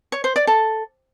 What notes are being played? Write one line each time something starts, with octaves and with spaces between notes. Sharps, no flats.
C#5
C5
D5
A4